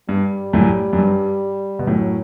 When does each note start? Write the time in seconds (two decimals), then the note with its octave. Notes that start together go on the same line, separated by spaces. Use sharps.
0.09 G2 G3
0.53 F#2 A2
0.93 F#2
0.98 G2
1.79 B2
1.87 F#2 A2 F#3